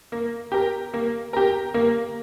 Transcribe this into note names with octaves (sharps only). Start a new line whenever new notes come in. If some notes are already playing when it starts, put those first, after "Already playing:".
A#3
G4 A#4
A#3
G4 A#4
A#3